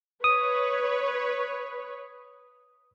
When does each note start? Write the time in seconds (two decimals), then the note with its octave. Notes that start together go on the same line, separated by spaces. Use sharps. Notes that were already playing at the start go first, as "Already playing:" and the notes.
0.24 B4 C#5 D#6